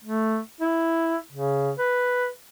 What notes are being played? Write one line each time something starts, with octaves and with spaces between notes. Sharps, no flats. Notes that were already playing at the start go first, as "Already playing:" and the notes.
A3
E4
C#3
B4